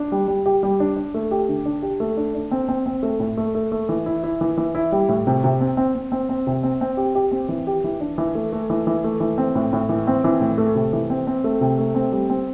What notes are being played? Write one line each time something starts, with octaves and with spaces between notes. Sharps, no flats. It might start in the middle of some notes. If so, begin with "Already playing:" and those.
Already playing: D4
G3
G3
G4
G3
D4
D4
A3
G4
D3
D4
G4
A3
D4
D4
C4
C4
C4
A3
A2
A3
A3
A3
E3
E4
E4
E3
E3
E4
G3
A2
C3
C3
C4
C4
C4
C4
C4
C3
C4
C4
G4
G4
C4
E3
G4
E3
D4
E3
A3
A3
E3
E3
A3
E3
C4
A2
A2
E3
C4
E3
A2
A3
C3
E3
C4
C4
A3
C3
A3
C4
G3
C4